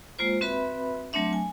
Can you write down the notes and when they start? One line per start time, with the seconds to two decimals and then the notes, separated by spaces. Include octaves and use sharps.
0.19 G#3 A#3 F4 C5
0.41 C4 F#4 B4 E5 B5
1.13 F#3 A3 C4 D4 E5
1.33 G#5